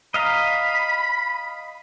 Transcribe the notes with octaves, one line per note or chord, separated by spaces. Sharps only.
D#5 F5 A#5 B5